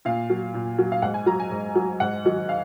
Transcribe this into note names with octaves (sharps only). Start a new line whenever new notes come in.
A#2 F5
F#3
A#2
F#3
F5
G#2 F#5
G#5
F#3 A#5
G#5
G#2
F#3
G#2 F#5
D#3 F#3
F5